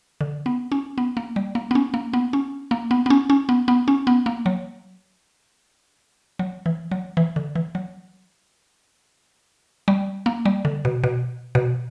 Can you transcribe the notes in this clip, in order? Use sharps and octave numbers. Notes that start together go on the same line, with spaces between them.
D3
B3
C#4
B3
A#3
G3
A#3
B3
C#4
A#3
B3
C#4
A#3
B3
B3
C#4
C#4
B3
B3
C#4
B3
A#3
F#3
F#3
E3
F#3
E3
D3
E3
F#3
G3
A#3
G3
D3
B2
B2
B2